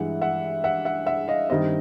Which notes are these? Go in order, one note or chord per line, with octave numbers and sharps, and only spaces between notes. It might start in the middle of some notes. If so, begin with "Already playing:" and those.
Already playing: G2 E3 G#3 E5 F#5
E5 F#5
E5 F#5
E5 F#5
E5 F#5
D#5 F5
G2 D#3 G3 C4 D#5